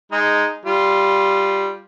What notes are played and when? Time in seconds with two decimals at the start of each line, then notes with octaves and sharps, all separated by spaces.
0.12 G#3 D#4
0.65 G3 F4